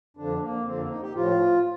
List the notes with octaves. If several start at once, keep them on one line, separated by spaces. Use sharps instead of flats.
F2 D3 F3 D4
A#3
F2 D3 F3 C4
A#3
D#4
G4
A2 F3 F4